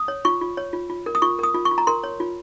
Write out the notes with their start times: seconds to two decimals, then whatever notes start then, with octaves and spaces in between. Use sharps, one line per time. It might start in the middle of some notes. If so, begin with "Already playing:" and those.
Already playing: D#6
0.08 C#5
0.25 F4 C#6
0.41 F4
0.57 C#5
0.73 F4
0.90 F4
1.06 A#4
1.15 D#6
1.22 F4 C#6
1.39 A#4 D#6
1.54 F4
1.65 C#6
1.71 F4
1.78 A#5
1.87 A#4 C6
2.04 C#5
2.20 F4